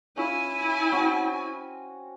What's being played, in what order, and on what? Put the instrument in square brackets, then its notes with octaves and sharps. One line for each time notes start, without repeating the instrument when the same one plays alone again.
[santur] C#4 F4 [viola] E4 G#5
[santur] C4 C#4 F#4